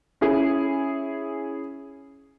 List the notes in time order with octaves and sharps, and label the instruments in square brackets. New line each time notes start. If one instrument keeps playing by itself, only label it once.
[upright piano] C#4 E4 G#4